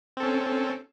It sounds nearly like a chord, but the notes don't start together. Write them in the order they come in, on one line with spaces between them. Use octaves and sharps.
C4 A4 C#4